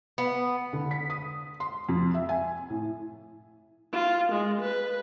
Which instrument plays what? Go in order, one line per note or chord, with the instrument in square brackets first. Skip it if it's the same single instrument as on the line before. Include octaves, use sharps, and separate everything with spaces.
[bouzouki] B3
[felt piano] D3
B6
D#6
C6
F2
E5
G#5
A2
[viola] F4
G#3
B4